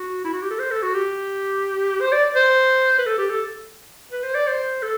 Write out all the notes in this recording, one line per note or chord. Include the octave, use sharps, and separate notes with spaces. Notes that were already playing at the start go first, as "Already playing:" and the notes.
Already playing: F#4
E4
F#4
G4
A4
C5
A4
F#4
G4
C5
D5
C5
B4
A4
G4
A4
B4
C5
D5
C5
A4